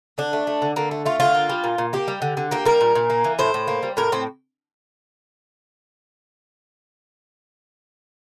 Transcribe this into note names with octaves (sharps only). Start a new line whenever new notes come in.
D3 D4
A3
A3
D3
D3 A#3
A3
A3 F4
D3 F4
A#3
G3
A#2
A#2
A#3 G4
G3
D3
D3
A#3 G4
G3 A#4
A#2
A#2
A#3
E3
A2 C5
A2
A#3
G3
A2 A#4
A2 C4